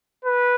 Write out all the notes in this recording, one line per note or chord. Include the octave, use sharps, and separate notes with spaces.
B4